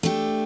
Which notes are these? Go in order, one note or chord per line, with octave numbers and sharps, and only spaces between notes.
A3 D4 G4